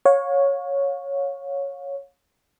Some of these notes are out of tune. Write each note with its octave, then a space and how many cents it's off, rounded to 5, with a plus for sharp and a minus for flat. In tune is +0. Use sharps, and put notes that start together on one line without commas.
C#5 +0 F5 +35